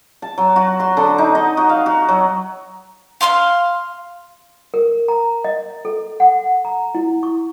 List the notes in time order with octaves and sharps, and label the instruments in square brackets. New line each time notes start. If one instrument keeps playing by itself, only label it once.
[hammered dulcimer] A5
F#3
F#4
C6
D3
D#4
D#5
F#4
F5
F#4
F#3
[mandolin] F5 C6 E6 F6
[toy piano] A#4
A#5
D#5
A4
F#5
A#5
E4
C#6